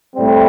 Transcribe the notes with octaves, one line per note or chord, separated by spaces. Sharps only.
A2 G3 C4